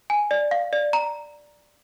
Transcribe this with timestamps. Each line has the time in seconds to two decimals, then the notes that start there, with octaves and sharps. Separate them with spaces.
0.10 G#5
0.31 D5
0.51 F5
0.73 D5
0.93 A#5